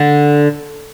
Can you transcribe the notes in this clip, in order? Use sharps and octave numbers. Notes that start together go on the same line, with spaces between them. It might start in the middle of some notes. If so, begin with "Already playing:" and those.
Already playing: D3